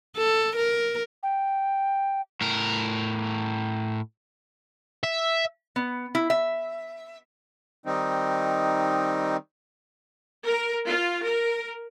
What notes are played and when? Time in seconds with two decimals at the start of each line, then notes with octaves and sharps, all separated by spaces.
0.17 A4
0.56 A#4
1.23 G5
2.41 A2 A#4
5.04 E5
5.76 B3
6.15 E4
6.30 E5
7.86 D#3 G3 C4 D#4
10.48 A#4
10.87 F4
11.24 A#4